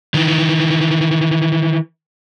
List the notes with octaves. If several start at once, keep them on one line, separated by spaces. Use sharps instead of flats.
D#3 E3